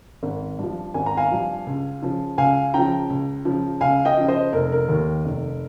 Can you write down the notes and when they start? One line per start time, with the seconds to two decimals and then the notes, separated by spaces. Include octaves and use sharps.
0.23 G#1
0.59 G2 F3
0.94 G#1 G#5
1.06 A#5
1.17 F5 G#5
1.31 G2 F3
1.66 C#2
2.02 C#3 F3
2.38 C#2 F5 G#5
2.74 C#3 F3 G5 A#5
3.10 C#2
3.45 C#3 F3
3.81 C#2 F5 G#5
4.05 D#5 G5
4.17 C#3 F3
4.28 C5 D#5
4.53 F1 A#4
4.72 A#4
4.88 D#2 D#3
5.25 F1